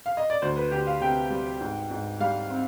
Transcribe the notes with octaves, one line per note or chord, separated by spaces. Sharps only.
F5
D#5
D5
D2 C5
B4
D2 G4
F5
C3 G5
G3
G#2
G#2
G3 F5
C4